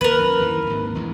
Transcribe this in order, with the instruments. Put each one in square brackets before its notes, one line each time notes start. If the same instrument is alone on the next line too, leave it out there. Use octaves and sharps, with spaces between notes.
[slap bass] D#2 [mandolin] A#4 B4
[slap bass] F#2
D#2 D#3 E3
G#1 D#2
A1 E2 G2